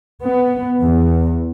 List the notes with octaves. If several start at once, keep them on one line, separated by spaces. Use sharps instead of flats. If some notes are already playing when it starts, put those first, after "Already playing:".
B3
E2